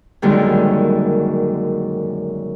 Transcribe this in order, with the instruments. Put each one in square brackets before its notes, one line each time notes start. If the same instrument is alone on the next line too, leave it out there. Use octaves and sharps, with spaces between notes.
[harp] F#2 A#2 D3 D#3 G3 G#3